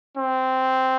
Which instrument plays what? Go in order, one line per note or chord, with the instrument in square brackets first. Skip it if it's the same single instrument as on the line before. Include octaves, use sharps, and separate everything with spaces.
[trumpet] C4